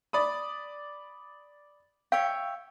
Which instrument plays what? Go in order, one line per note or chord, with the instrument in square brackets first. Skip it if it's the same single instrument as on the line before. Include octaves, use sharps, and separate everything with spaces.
[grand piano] D5 B5 D#6
[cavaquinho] C#5 E5 G5 [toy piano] F5